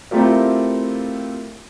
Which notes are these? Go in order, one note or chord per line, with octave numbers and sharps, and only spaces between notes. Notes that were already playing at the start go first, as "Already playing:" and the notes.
A3 C4 E4 F4 G4 A#4